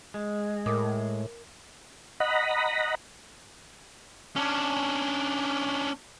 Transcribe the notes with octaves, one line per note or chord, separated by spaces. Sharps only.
G#3
A2 A#4 D6 D#6
D#5 F#5 A#5 B5
C#4 D4